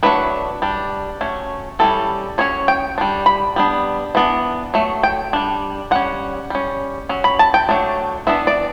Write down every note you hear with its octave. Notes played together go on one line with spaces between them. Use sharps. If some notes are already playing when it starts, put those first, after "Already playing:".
F#3 A3 D4 B4
G3 D4
F#3 A3 C#4
E3 G3 C#4 A4
F#3 C#4 C#5
G5
G3 D4
B5
G3 B3 D4
E3 B3 D4
F#3 A3
G5
G3 D4
G3 C#4 F#5
G3 C#4
F#3 C#4
B5
A5
G5
F#3 A3 D4
E3 B3 D4 E5
D5